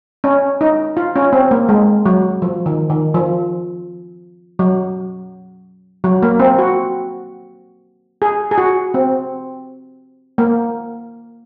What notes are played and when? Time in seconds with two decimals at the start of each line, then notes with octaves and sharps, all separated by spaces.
0.24 C#4
0.61 D#4
0.97 F4
1.16 C#4
1.33 C4
1.51 A#3
1.69 G#3
2.06 F#3
2.42 F3
2.66 D#3
2.90 D#3
3.14 F3
4.59 F#3
6.04 F#3
6.23 A#3
6.40 C4
6.59 F#4
8.22 G#4
8.51 G#4
8.58 F#4
8.94 C4
10.38 A#3